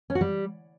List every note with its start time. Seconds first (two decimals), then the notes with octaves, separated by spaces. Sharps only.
0.10 C#4
0.15 F#4
0.21 G3